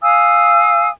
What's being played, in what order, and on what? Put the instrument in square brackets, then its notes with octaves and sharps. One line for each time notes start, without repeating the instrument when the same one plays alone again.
[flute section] F5 G#5 D#6 E6